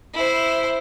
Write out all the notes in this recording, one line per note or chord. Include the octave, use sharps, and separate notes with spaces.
E4 C5